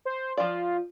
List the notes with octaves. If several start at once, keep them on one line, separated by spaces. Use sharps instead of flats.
C5
F3 F4 D5